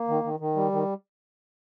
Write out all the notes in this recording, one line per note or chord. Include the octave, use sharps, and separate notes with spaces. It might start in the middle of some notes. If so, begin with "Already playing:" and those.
Already playing: A#3
D#3
D#3
D#3
G3
D#3